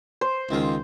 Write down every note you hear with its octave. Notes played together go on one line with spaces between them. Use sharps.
C5
C#2 D#3 F4